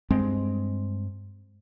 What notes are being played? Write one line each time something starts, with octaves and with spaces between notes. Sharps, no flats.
G2 G#3 C4